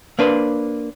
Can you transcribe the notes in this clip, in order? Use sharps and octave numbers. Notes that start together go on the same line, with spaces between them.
A#3 D4 B4 C5